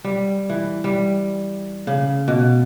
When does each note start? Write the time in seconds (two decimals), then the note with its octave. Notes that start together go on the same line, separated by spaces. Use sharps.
0.04 G3
0.50 E3
0.84 G3
1.87 C#3
2.28 B2